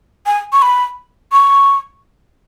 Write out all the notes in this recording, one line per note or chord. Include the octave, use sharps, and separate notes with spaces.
G#5
C#6
B5
C#6